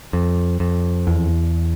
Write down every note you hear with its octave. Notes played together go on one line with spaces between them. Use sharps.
F2
F2
E2